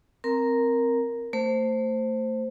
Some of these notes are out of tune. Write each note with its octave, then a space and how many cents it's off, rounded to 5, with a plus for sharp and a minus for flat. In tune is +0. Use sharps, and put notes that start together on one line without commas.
C4 +0 A#4 +0 A#5 +0
A3 +30 C5 +0